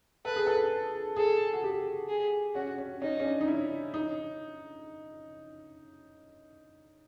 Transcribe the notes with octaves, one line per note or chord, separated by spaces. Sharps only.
A4 B4
G#4
A4
G#4 A4
F#4
G4
G#4
C#4 F#4
C#4
C#4 D#4
C#4
D4
D#4
E4
D#4